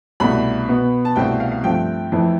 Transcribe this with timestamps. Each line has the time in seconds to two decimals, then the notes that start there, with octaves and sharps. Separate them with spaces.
0.20 C2 B2 A3 B5
0.69 B2 B3
1.05 A5
1.16 C2 B2 A3 C4 G5
1.40 F5
1.52 F5
1.64 G2 F3 A3 C4 G5
2.12 F2 E3 A3 C4